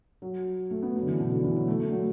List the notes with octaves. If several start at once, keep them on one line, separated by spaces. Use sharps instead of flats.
F#3
A3
B3
F#3
D3
E3
B2
D3
E3
F#3
A3
A3
F#3